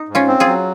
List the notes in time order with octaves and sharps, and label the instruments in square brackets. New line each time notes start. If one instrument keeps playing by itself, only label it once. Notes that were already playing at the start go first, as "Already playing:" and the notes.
Already playing: [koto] D#4
[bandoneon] G#2
[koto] C#4 F4
[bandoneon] C4
[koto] F4 G#4
[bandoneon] F#3